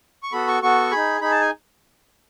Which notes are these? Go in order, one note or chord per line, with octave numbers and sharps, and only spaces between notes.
C#6
B3 F#4 A4 B5
C#6
B3 F#4 A4 C#6
D#4 G#4 B5
D#4 G#4 B5
A5
G#5